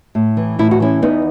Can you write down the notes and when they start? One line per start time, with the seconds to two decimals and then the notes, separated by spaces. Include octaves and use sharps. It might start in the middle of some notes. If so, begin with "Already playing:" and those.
0.15 A2
0.37 E3
0.59 A2 E4
0.71 F#4
0.80 E3 C#4 E4
1.02 E2 B3 D#4